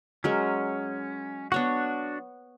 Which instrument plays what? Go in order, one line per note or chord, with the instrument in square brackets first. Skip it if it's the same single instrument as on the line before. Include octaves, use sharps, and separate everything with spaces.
[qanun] F#3 G#3 A#4 [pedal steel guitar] C#4
[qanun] B3 C#5 F#5 [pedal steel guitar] D4 F#4